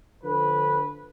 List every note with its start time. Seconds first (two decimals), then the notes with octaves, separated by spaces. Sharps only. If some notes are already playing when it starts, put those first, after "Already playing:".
0.23 D3 F3 B4